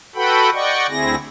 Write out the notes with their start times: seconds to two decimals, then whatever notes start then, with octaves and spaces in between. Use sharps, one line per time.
0.15 F#4 A4 B4 F#5 G5 B5
0.53 D5 D#5 F#5 G5 C#6
0.90 D2 C4 E4 G#4 A#6